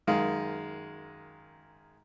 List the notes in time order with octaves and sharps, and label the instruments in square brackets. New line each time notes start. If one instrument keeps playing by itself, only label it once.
[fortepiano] F#2 D#3 G#3 F5